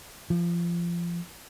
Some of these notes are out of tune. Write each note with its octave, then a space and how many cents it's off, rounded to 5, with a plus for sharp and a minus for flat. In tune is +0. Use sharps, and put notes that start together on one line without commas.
F3 -25